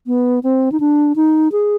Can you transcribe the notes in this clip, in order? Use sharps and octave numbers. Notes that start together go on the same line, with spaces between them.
B3
C4
D#4
D4
D#4
G#4